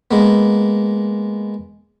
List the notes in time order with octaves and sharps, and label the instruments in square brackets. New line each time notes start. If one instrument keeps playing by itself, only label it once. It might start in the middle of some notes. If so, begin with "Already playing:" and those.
[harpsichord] G#3 A#3 B3